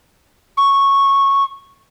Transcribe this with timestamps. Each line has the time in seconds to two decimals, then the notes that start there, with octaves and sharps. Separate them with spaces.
0.57 C#6